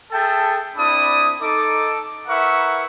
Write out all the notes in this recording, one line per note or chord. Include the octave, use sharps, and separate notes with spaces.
G#4 A4 E5 G5 A5
C4 D4 E4 D5 B5 D#6
D#4 A4 D6
E4 A#4 B4 E5 F#5 C#6